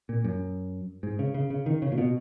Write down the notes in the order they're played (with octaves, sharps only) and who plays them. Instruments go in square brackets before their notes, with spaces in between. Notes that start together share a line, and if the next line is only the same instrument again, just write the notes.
[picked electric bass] A#2
F#2
G#2
C#3
C#3
C#3
D#3
C#3
A#2
B2